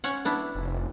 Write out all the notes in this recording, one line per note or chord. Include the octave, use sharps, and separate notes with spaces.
C#4 C#5 F#5
B3 D4 E4
F1